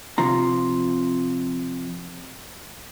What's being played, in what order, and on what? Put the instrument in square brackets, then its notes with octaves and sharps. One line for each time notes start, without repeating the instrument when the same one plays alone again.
[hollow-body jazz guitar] C3 F3 F4 A#5